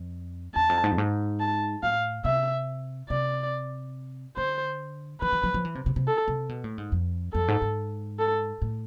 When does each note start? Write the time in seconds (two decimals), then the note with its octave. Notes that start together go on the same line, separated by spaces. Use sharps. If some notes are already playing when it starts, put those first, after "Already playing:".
Already playing: F2
0.55 E2 A5
0.69 F2
0.84 G#2
0.91 F2
0.98 G#2
1.40 A5
1.83 A2 F5
2.25 C3 E5
3.09 C3 D5
4.36 D3 C5
5.21 E3 B4
5.33 E3
5.44 F3
5.54 F3
5.65 E3
5.75 C3
5.86 C3
5.96 C3
6.07 A4
6.28 C3
6.49 B2
6.64 A2
6.78 G#2
6.92 F2
7.33 F2 A4
7.48 G#2
7.62 G#2
8.19 A4
8.62 A2